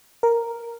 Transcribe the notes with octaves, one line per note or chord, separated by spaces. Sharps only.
A#4